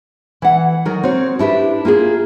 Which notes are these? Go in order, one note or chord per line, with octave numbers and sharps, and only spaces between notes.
E3 F#5
D#3 F#3 A#4
C4 F#4 C#5
D4 E4 G4 B4
A#3 F4 G4 G#4